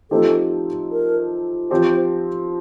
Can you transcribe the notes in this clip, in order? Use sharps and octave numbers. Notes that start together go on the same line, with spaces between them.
F3 A3 C4 D#4 G4 A4
A#4
F3 C4 G4 C5